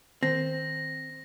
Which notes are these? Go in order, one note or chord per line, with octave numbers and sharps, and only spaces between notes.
D#3 C4 A#6